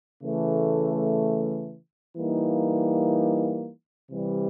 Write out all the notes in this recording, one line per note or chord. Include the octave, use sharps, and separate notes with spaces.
C#3 E3 A3
E3 G3 A#3 D#4
C3 E3 G3